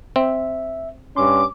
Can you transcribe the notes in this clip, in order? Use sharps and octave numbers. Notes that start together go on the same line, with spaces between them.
C4 E5
G2 C#4 C6 D6